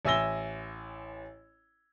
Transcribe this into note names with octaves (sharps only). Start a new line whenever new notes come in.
A1 E5 G#5 E6 A#6 G7